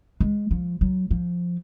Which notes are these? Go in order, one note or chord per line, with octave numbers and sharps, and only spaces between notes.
G#3
F3
F#3
F3